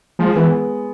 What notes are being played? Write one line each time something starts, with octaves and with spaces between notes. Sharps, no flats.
F3 G#3
E3 B3